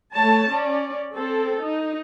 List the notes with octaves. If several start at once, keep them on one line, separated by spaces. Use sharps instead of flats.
A3 C#5 A5
C#4 D5
C4 A4
D#4